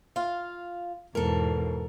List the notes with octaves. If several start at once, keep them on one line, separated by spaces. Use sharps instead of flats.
F4 F5
E2 G#2 B2 A4 A#4